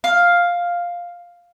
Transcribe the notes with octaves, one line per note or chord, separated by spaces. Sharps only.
F5